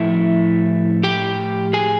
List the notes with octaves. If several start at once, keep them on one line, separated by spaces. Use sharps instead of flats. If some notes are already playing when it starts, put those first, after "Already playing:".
Already playing: A2 F3 A3 E4 E5
G4 G5
G#4 G#5